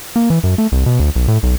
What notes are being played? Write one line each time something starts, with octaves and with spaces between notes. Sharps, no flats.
A#3
E3
F#2
A3
C2
B2
D2
B1
A2
B1